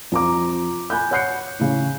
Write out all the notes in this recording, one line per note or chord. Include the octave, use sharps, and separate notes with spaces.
F2 A#5 D6
G#5 B5 F#6 G6
C#5 F#5 F#6 G6 C7 C#7
A2 C#3